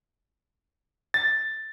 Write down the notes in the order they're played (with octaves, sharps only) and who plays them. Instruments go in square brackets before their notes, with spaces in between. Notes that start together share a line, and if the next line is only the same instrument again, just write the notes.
[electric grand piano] A6